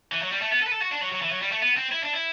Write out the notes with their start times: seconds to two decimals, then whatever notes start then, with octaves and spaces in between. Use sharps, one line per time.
0.12 E3
0.22 F#3
0.32 G3
0.42 A3
0.52 B3
0.62 A4
0.67 B4
0.72 A4
0.82 F#4
0.91 D4
1.02 F#3
1.12 F#3
1.22 E3
1.32 F#3
1.42 G3
1.52 A3
1.62 B3
1.77 C4
1.92 E4
2.02 D4
2.13 E4